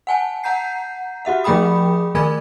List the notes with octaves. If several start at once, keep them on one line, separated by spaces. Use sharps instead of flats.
F#5 G#5 A5
F#5 A#5 G6 C7
F#4 G4 E5 F#5
F3 A3 G#4 G5 B5 D#6
D#3 A3 A#4 G#5 B5 G#6